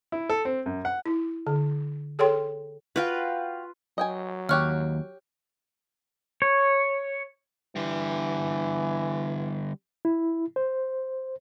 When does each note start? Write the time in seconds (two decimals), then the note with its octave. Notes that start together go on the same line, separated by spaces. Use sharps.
0.12 E4
0.30 A4
0.45 C4
0.66 F#2
0.85 F#5
1.06 E4
1.47 D3
2.19 G#4 A4 C#5 G5 C6
2.96 F4 F#4 B4 F5 G5
3.98 F#3 D#5 G5 G#5
4.49 D#2 G4 C#5 F#5 F6 F#6
6.42 C#5
7.76 D3 E3 G3
10.05 E4
10.56 C5